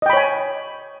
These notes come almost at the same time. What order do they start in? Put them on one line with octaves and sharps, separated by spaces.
D#5 G5 B5 C#5 G#5